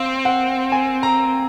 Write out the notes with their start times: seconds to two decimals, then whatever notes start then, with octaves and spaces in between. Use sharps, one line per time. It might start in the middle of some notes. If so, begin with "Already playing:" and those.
Already playing: C4 F5
0.25 F#5
0.72 G#5
1.03 A#5